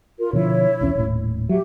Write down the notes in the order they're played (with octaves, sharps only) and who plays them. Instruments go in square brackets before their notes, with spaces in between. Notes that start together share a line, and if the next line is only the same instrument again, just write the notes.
[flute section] F4 A#4
[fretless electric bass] B2 D3 F3 [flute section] E4 C#5
[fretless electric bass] B1 E2 C#4
D#1 A2
[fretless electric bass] F#3 [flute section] G4 E5